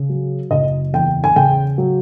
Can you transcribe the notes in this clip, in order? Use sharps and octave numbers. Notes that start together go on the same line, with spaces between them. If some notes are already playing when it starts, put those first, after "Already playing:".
Already playing: C#3
F#3
F#1 D#5
E2 G5
G#5
C#3 G5
F#3